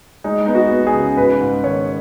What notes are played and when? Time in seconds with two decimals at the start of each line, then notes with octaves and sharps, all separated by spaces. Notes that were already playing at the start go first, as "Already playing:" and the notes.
0.24 G#3 D#4
0.46 B3 D#4
0.55 F#4
0.70 B3
0.87 G#4
0.94 C#3
1.17 G#2 B4
1.41 G#2
1.64 D#3 C#5